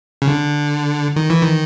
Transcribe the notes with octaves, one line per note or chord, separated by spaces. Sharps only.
C#3
D3
D#3
E3
D#3